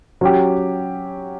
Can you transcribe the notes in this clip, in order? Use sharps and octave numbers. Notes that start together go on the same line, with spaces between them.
F#3 C#4 G4